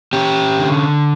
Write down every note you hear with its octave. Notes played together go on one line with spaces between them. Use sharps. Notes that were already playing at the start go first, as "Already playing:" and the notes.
C#4 G4
D3